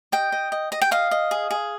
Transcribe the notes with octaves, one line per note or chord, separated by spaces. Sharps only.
D#5 G5
D#5
D#5
D#5
G5
D#5 F5
D#5
G#4
G#4